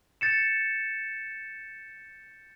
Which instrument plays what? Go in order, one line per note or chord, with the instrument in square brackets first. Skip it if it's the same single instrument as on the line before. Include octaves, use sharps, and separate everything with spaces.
[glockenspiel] G6 A6 C#7 E7